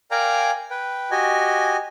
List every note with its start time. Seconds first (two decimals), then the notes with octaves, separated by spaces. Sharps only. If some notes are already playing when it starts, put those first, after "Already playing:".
0.11 A#4 D5 F5 G5 G#5 A#5
0.71 B4 G5
1.11 F#4 G4 D#5 G#5